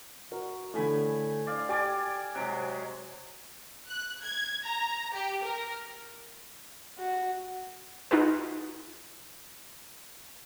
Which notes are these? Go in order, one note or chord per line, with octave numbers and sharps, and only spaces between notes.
F#4 A#4
A2 D3 A3 G#5 B5
D5 F5
G4 D5 G#5 D6
C3 F#3 G#3 F#6 D7
F#6
G#6
A#5
G4
A#4
F#4
D#4 F4 F#4 G#4 B4